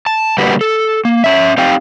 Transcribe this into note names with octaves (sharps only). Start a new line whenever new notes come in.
A5
D3 G3 A#3 F#4 G4 B4
A4
A#3
C#4 E5
C4 D#4 G4 F5 G5